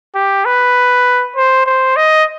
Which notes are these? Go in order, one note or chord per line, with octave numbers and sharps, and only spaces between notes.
G4
B4
C5
C5
D#5